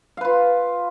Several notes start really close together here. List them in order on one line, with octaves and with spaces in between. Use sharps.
F5 B4 F4